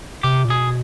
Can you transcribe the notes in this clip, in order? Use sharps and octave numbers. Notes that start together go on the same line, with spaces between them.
C3 G4
A#2
B2 G#4